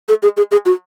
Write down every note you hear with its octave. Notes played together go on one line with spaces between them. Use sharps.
A4
G#4
G#4
G#4
F#4